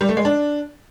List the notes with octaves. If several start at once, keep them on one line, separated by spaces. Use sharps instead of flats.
G3
A3
G#3
D4